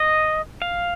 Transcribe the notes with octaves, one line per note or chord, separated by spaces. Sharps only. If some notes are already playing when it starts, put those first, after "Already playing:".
Already playing: D#5
F5